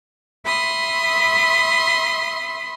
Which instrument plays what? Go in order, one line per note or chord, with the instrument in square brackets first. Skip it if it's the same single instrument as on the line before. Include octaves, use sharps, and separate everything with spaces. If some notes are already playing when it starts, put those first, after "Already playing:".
[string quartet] E5 B5 C6 D#6